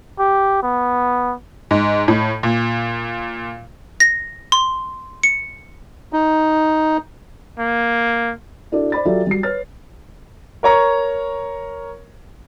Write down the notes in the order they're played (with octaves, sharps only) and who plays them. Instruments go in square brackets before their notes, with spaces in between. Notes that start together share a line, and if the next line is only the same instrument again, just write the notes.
[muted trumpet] G4
B3
[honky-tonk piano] G#2
A2
A#2
[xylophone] A#6
C6
C#7
[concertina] D#4
[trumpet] A#3
[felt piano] D4 E4 F#4 A4 D5
C5 D5 B5 A6
F#3 F4 G4 A4 D5 E5
G3 F#4 C7
B4 C#5 F6 A6
[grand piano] A#4 C#5 A#5 C#6